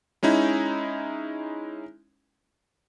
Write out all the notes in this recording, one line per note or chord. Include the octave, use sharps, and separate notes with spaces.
G#3 C#4 D#4 E4